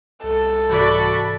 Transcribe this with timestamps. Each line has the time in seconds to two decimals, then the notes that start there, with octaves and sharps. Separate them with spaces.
0.23 C2 A4
0.70 G#2 C3 E3 F#4 D5 B5